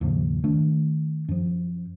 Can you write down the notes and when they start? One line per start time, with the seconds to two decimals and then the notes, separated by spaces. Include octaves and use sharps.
0.01 D#2 G#2 C#3 F3
0.44 D#3 A3 D4
1.28 F#2 F3